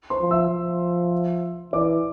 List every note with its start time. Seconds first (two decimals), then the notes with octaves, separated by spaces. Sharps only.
0.10 C5 C6
0.21 F3
0.31 E5 E6
0.51 F3
1.73 E3 D5 D6